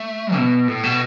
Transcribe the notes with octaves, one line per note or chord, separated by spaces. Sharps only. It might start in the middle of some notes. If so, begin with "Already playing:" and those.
Already playing: A3
B2
A2
B2